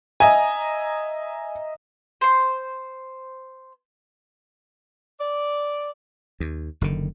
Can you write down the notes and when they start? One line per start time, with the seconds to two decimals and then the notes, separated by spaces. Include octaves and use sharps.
0.20 D#5 E5 G#5 A#5
2.21 C5 C6
5.20 D5
6.40 D#2
6.81 F#1 D3 D#3